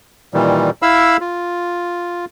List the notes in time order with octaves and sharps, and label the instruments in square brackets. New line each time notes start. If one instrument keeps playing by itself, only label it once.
[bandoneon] A#2 D#3 E3 G3
E4 F5 B5 E6
F4